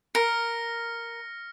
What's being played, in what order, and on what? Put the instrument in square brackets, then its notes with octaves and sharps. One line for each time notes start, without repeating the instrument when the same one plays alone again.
[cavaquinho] A#4 [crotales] F6 A#6 C#7